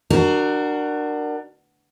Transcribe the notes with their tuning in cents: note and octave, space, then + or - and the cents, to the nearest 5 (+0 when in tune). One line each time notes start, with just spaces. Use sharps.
D4 +25 F#4 +15 A#4 -5